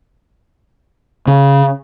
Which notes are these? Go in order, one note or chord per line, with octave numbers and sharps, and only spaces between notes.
C#3